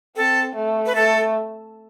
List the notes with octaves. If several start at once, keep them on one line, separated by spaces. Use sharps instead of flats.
C4 A4
A3
B4
A3 A4